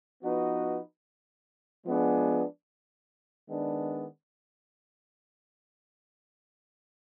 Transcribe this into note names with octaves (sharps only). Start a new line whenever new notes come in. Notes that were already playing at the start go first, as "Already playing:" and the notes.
F3 B3 D#4 F#4 B4
F3 G#3 B3 D4 G#4
D#3 G#3 B3 D4